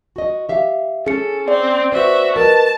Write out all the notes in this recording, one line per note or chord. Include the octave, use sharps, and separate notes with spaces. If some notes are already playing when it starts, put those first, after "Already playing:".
F#4 D#5
G4 E5 F5
C#4 G#4 A4 C#7
C4 D5
F#4 B4 C5 E5
A#4 B4 D#5 A5